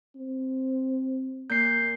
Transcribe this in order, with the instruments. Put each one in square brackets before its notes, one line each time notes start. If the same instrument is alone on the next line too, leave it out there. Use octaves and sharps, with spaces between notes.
[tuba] C4
[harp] A#2 [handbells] G6 C7